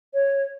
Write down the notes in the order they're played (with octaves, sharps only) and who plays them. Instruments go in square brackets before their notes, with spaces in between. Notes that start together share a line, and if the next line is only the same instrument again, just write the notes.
[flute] C#5